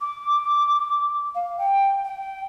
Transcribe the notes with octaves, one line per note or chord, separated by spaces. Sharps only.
D6
F5
G5
G5